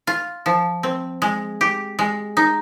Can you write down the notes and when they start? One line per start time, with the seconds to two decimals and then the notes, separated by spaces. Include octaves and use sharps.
0.07 F4
0.46 F3
0.83 C4
1.22 G#3
1.61 G4
1.99 G#3
2.37 D#4